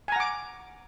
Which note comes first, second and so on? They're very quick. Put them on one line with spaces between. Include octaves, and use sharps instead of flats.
G#5 A#5 F#5 D6